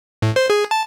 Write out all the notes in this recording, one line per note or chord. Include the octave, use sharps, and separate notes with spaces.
A2
C5
G#4
A5